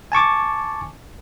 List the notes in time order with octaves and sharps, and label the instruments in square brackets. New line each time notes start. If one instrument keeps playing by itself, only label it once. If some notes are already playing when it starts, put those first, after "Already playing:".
[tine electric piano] G#5 A5 C#6 D6